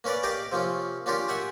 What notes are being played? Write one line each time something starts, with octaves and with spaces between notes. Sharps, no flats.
A#3 C#4 A#4 B4 D5
G4 A#4 D5 D#5 F5 G5
C3 F3 A#3 C#4
A#3 C#4 D4 F4 G4 A#4
G4 E5 F#5 G#5